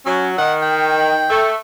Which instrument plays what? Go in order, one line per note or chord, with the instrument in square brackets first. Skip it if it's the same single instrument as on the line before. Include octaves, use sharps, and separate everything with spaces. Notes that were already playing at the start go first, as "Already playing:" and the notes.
[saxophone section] F#3 [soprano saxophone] C#4
[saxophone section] D#3 [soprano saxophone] F#5
[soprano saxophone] G5
[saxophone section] A3